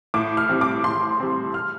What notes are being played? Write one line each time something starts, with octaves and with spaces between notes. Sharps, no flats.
A2 D6
F6
G3 C4
D6
A2 C6
G3 C4
F6